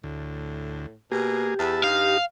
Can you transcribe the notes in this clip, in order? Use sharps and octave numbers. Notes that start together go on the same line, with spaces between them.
D2 A2
B2 A#3 G4 G#4
E2 E5 A5 B5
G2 D#4 F5